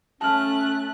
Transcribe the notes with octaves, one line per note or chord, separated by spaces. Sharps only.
A3 C#4 A5 F6 F#6